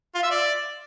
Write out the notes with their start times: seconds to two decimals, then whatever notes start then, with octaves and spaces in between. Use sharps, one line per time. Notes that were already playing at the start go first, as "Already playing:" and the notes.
0.15 F4
0.23 E5
0.31 D5